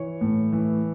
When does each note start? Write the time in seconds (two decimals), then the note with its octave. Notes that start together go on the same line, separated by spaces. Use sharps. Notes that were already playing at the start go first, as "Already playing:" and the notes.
Already playing: E3 C#5
0.21 A2
0.52 E3